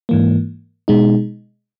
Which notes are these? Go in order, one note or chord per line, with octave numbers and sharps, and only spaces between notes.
G#2 E3 A#3
B2 G#3 D#4